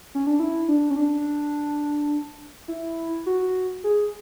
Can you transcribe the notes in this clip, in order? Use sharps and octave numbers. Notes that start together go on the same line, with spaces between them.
C#4
D4
E4
D4
C#4
D4
E4
F#4
G#4